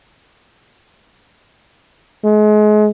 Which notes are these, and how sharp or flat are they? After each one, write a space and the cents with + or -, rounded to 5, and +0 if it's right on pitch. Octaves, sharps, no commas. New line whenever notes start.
G#3 +35